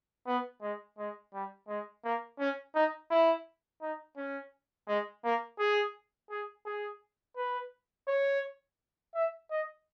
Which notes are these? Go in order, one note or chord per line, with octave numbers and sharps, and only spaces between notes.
B3
G#3
G#3
G3
G#3
A#3
C#4
D#4
E4
D#4
C#4
G#3
A#3
G#4
G#4
G#4
B4
C#5
E5
D#5